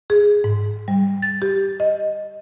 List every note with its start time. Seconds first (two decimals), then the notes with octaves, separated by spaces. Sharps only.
0.10 G#4
0.44 G#2
0.88 G3
1.22 A6
1.42 G4
1.80 D#5